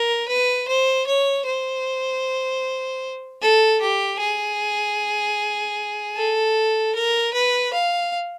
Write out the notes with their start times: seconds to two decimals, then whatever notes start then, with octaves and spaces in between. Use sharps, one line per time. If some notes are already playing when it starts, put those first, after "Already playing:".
Already playing: A#4
0.28 B4
0.68 C5
1.06 C#5
1.46 C5
3.42 A4
3.81 G4
4.20 G#4
6.16 A4
6.95 A#4
7.33 B4
7.73 F5